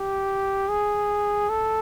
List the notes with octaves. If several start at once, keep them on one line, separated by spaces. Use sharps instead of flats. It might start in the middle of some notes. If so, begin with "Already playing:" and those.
Already playing: G4
G#4
A4